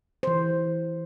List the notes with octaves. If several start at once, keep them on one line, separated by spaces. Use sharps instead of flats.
E3 C5